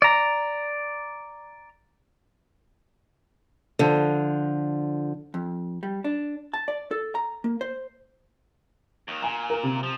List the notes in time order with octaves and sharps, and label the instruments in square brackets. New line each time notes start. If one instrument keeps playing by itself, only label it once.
[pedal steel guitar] D5 A#5
[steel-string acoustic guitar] D3 F3
[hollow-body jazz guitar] F2
G3
D4
A5
D5
A4
A#5
A#3
C5
[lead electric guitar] D#2 D#3
[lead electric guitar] A#2 [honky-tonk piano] G#5 A#5
[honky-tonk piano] A#4 E7
C3
[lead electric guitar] F3